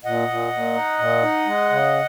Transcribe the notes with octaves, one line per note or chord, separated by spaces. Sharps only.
A#2 D#5 F#5
A#2
A#2
D#4
A#2
D#4
G#3
C#3